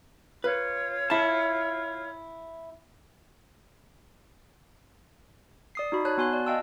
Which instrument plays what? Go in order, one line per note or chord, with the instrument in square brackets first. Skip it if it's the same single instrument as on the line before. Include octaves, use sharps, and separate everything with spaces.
[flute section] F4 C#5 [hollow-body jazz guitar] B4
[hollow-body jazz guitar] E4 A5
[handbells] D5 D#6 C7
D#4 F#4 B5
C#5 A5 F#6
B3 F#4 G#5 C6 F#6
D5
D#5 F5 G5 A5 E6